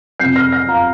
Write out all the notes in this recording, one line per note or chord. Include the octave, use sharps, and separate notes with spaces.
F2 C3 G6 C7
F6 A#6
F6 A#6
F5 A#5